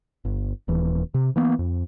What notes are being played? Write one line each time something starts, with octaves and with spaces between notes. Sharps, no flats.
G1
D#1 E3
C3
E3 A#3 B3
F2